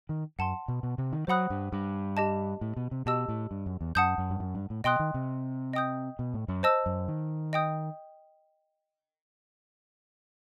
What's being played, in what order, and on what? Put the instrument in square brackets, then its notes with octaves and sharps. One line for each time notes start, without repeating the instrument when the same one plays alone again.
[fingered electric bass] D#3
[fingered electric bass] F#2 [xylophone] F#5 A5 C6
[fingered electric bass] B2
B2
C3
D#3
[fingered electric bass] F#3 [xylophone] C5 F#5 B5 D#6 F#6
[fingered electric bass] G2
G2
[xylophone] G4 D#5 A5
[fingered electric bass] A2
B2
C3
[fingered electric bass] B2 [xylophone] G4 D#5 A5 E6
[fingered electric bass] A2
G2
F#2
E2
[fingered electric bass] F#2 [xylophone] F#5 A5 D#6 G6
[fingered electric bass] F#2
G2
F#2
G2
A2
[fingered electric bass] B2 [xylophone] D#5 G5 C6 D#6 F#6
[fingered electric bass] D#3
C3
[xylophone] D#5 G5 D#6 G6
[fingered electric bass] B2
A2
F#2
[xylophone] C5 D#5 A5 E6
[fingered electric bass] F#2
D#3
[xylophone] D#5 G5 D#6 G6